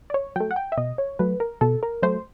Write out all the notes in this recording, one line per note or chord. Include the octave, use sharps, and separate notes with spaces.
D5
C#5
F#3 A3 G5
F#5
G5
E5
B2 D#5
C#5
F#3 A3 B4
A#4
B2 A4
A#4
F#3 A3 C5